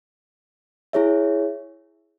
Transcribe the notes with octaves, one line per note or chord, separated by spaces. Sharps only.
E4 G#4 C#5 E5